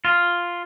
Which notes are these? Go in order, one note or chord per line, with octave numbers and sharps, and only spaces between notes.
F4